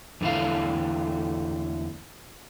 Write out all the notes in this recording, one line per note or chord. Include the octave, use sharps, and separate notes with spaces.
E2 D3 E3 A3 F5